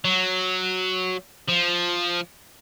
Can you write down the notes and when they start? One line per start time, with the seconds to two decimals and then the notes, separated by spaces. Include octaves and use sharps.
0.05 F#3
1.48 F3